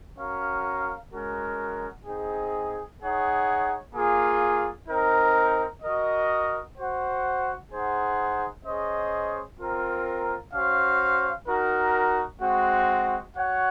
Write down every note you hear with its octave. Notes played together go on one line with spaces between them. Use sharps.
C#4 F#4 A#4 F5
G#3 C#4 F#4 A#4
C4 D#4 G#4
D#4 G#4 C#5 F#5
A#3 F4 G#4
C4 D#4 A#4
F#4 A#4 D#5
F#4 C5 F#5
D#4 G#4 C5 F#5
C#4 G#4 C5 D#5
C4 F4 A#4
C#4 F#4 C5 F5
D#4 F#4 A#4
G#3 C4 F#4
F#4 C#5 F#5